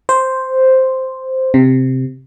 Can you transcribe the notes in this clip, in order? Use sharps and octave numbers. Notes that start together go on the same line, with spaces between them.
C5
C3